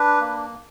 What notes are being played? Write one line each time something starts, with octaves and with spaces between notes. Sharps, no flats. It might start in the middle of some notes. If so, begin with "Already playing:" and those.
Already playing: D4 B4
A#3